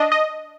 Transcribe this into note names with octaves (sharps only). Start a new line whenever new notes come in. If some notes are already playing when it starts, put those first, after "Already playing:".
Already playing: D4 D#5
D#5